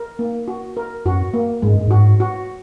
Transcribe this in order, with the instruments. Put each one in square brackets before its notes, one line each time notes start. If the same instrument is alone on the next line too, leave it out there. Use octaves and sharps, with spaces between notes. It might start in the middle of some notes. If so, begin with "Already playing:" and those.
Already playing: [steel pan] A#4
A#3
F#4
A#4
[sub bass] F#2 [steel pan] F#4
[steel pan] A#3
[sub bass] G#2 [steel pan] G#3
[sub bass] G2
[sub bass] G#2 [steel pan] F#4
[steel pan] F#4